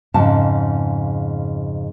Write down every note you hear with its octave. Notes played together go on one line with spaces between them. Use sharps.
F2 G#2 C#3 A5